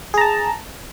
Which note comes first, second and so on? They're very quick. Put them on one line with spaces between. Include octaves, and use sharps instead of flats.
G#4 A#5 A5